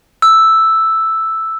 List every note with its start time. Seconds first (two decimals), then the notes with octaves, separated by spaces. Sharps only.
0.22 E6